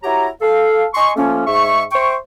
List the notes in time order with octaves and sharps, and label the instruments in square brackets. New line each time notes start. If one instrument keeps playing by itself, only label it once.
[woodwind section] E4 F#4 G4 C#5 A#5
A4 F5
D#5 G#5 C6 C#6
F3 A3 A#3 C#4
G#2 E5 C#6
C5 E5 G5 C#6